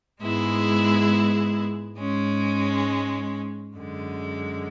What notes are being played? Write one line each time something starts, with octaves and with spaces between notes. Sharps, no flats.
G#2 G#3 B3 E4 G#4
G#2 G#3 C#4
F#2 D3 G#3